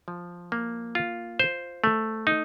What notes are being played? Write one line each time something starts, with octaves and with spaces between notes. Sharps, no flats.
F3
A#3
F4
C5
A3
D#4